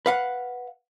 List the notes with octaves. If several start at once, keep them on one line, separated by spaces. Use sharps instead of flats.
B4 F5 F#5